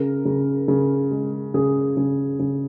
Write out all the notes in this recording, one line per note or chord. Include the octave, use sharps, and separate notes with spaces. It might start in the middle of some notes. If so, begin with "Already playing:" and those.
Already playing: C#3 A#4
C#3
C#3
G#3
C#3 G#4
C#3
C#3